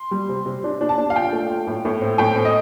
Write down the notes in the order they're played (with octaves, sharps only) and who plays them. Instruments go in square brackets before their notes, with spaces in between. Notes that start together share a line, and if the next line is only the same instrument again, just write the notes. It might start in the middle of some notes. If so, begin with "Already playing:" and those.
Already playing: [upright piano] C6
G3
C3
C3
D4
D4
A5
D4
F5
F4 G5
A3
F4
A2
A2
C4
A2 G5
C4
D#5